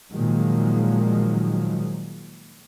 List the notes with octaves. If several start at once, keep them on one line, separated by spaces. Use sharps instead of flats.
A#2 D#3 F3 F#3 G#3